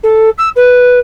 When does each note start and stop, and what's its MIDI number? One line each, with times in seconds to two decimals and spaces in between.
0.03 0.29 69
0.38 0.49 88
0.56 0.99 71